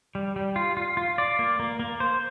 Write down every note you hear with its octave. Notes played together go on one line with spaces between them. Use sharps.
G3
G3
F4
F4
F4
D5
A#3
A#3
A#3
C5